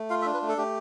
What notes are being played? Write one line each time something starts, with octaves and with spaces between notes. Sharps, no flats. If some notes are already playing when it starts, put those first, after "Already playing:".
Already playing: A3
F4 F5
E5
D4
B4
A3
A4
A3 G4